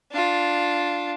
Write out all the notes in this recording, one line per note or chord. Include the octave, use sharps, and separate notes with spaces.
D4 F4